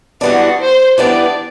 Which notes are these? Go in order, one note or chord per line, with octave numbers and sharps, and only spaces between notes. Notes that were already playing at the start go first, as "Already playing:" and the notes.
E3 G3 B3 D4 F#4
C5
E3 G3 B3 D4 D5